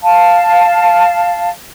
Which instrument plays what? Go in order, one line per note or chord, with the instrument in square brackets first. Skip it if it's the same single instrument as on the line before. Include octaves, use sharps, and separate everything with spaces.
[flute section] F5 A5